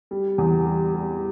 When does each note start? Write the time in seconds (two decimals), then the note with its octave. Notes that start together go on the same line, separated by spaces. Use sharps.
0.11 G3
0.38 E2
0.66 G3
0.94 G3